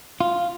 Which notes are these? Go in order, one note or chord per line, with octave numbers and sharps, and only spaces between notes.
F4